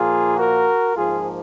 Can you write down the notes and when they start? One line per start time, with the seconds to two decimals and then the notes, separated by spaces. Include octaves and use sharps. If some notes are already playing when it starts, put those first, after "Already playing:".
Already playing: A#2 F3 A#3 F4 G#4
0.37 F#4 A#4
0.96 G#2 F3 A#3 F4 G#4